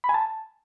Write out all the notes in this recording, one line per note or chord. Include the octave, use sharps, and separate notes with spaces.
B5
G#5
A5